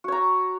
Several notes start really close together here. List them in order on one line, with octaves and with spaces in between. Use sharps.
F#4 C#5 A#5